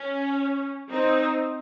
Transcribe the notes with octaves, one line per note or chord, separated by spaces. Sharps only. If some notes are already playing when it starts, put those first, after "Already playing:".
Already playing: C#4
C4 D#4